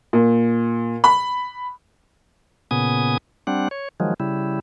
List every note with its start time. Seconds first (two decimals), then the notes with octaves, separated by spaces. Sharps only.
0.13 A#2
1.04 B5
2.71 A#2 C#3 B3 G#5 D#6
3.47 G3 C4 D4 F#5
3.71 C#5
4.00 D#3 F3 F#3 G#3
4.20 C#3 G3 E4